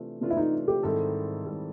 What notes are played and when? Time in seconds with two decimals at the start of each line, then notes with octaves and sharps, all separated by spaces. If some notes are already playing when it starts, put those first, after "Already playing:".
Already playing: C3 E3 A3 D4 F4
0.21 C3 E3 A3 D4 F4
0.30 E4
0.37 D#4
0.68 G4
0.83 G#2 D#3 G3 C4 E4 A4
1.45 G#2 D#3 G3 C4 E4